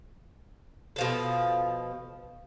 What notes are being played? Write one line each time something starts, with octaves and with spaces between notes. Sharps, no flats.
B2 F3 A4